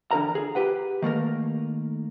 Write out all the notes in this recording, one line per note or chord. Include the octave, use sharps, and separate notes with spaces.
E2 D3 A#4 A#5
G#4
G4 B4 F#5
D#3 A3 A#3 A#4